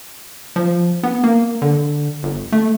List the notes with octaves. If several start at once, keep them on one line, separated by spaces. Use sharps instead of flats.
F3
B3
A#3
D3
G1
A3